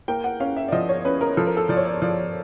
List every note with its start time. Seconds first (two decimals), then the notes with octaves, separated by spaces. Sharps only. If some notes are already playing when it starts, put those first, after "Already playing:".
0.08 A#3 G5
0.24 F#5
0.40 C#4 F5
0.56 E5
0.68 D5
0.72 F3 D#5
0.89 C#5
1.05 C#4 B4
1.21 A#4
1.37 F3 A4
1.47 A#4
1.57 A4
1.69 F3 D5
1.77 C#5
1.85 D5
2.02 F3 D5